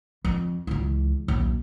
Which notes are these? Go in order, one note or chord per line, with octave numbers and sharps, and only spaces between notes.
F2
C#2 E3
D#1 B1